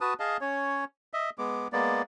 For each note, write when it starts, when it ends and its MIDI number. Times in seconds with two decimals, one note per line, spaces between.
0.01 0.14 66
0.01 0.14 71
0.01 0.14 81
0.01 0.14 87
0.20 0.37 68
0.20 0.37 75
0.20 0.37 77
0.20 0.37 81
0.41 0.85 61
0.41 0.85 73
1.14 1.30 75
1.14 1.30 76
1.38 1.68 56
1.38 1.68 59
1.38 1.68 86
1.73 2.02 56
1.73 2.02 58
1.73 2.02 59
1.73 2.02 74